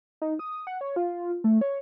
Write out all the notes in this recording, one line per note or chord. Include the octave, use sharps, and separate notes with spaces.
D#4
D#6
F#5
C#5
F4
A3
C#5